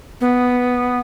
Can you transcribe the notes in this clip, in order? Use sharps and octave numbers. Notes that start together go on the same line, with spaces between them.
B3